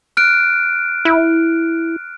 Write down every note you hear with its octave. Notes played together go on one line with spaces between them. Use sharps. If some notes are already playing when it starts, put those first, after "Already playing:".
F6 F#6 D7
E4